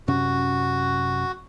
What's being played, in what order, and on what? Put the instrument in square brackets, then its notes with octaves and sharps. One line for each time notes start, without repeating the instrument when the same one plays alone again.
[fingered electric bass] F#2 C3 C#4 [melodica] F#4